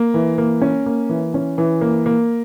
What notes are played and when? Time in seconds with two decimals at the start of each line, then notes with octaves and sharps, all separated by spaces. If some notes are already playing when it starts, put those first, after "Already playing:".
Already playing: A#3
0.14 E3
0.38 A#3
0.62 C#4
0.86 A#3
1.09 E3
1.34 C#4
1.58 E3
1.81 A#3
2.06 A#3